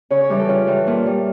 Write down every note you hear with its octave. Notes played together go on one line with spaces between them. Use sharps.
C#3 C#5
C#5
E3 G3 G4
A4
C#3 F4
E3 G3
A#2 F4
G3